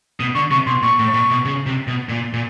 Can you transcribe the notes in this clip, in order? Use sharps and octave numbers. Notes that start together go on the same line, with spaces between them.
B2 D#6
D3 C#6
C3 C#6
B2 C6
A#2 C#6
A2
A#2
B2
C#3
C3
B2
A#2
A#2